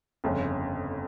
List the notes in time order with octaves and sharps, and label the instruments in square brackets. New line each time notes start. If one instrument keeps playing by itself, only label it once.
[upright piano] G1 F2 C#3